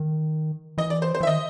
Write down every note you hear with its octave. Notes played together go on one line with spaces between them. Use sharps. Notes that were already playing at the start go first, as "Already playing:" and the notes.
Already playing: D#3
E3 D#5
D5
C5
C5
E3 E5
D#3 D#5